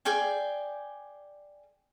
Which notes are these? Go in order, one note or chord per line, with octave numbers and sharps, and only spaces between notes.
G#4 D5 G5 G#5